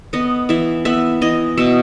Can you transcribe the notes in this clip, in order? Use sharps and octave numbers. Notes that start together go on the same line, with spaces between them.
B3 D#5
E3 E5
B3 E5
E3 D#5
B2 E5